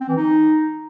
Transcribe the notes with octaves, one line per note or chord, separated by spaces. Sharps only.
C4
E3
D#4